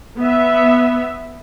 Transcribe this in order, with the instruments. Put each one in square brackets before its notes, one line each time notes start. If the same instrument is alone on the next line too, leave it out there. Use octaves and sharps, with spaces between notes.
[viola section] B3 E5